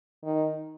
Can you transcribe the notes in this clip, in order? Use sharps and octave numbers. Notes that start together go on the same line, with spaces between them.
D#3